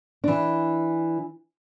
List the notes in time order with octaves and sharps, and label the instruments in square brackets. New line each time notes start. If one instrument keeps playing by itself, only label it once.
[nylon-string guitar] E3 D4